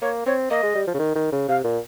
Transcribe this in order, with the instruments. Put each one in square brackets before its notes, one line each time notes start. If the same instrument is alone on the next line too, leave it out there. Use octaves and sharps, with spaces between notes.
[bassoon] A#3 [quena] C#5
[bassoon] C4 [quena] C#5
[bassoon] A#3 [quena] D#5
[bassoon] G#3
G3
F3
C#3
D#3
D#3
C#3
[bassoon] C3 [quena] F5
[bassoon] A#2